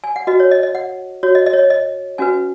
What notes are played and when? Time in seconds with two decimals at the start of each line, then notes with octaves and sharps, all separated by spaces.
0.04 G#5
0.16 F#5
0.27 F#4 B4 D#5
0.40 C#5
0.51 D#5
0.63 D#5
0.75 F#5
1.23 F#4 C#5
1.35 D#5
1.46 D#5
1.53 C#5
1.59 D#5
1.70 D#5
2.18 C#4 F#4 B4 G#5